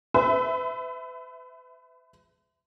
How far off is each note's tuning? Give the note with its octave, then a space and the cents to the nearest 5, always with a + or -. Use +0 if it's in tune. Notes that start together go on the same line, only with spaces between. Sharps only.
B4 +40 E5 +0